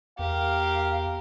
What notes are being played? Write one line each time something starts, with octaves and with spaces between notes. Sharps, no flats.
E2 G4 A#4 F5